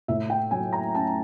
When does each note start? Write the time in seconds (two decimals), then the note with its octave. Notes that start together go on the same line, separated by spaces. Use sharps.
0.08 A2 E5
0.30 G5
0.51 F#3 G#5
0.73 A#5
0.95 C#4 A5